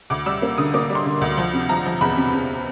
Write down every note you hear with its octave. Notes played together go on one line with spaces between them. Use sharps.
D2 D6
G3 E6
A#3
D3 D#6
A#3 D6
G3
C6
D3
D2
F3
C3
F3 A#5
F3
E2 B5
C3
C3